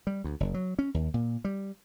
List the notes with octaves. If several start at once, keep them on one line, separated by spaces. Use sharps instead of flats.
G3
D2
F#1
F#3
C#4
D#2
A#2
G3